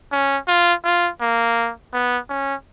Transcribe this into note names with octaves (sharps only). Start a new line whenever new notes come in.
C#4
F4
F4
A#3
B3
C#4